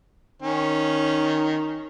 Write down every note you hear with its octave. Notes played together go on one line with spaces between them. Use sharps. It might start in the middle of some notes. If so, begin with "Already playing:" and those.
D#3 C#4